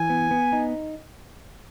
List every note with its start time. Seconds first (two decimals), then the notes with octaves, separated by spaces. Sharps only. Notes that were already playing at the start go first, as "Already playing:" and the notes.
Already playing: E3 G#5
0.10 B3
0.31 B3
0.53 D#4